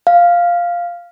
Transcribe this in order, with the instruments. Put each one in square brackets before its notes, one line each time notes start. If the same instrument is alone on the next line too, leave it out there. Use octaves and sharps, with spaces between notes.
[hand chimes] F5